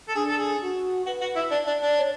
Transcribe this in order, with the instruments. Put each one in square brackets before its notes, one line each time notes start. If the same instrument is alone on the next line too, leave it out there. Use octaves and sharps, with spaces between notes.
[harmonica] A4
[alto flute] D4 [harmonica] G#4
[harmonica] A4
G#4
[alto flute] F#4
[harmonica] F#4 [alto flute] B4
[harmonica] F#4
E4
D4
D4
D4
[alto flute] C#5